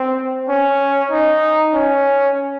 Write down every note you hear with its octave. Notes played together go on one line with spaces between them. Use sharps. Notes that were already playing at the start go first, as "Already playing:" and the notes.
Already playing: C4
C#4
D#4
C#4